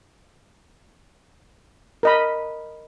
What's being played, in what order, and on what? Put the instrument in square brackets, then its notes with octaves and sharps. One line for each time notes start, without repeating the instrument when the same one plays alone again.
[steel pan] A#4 D#5 B5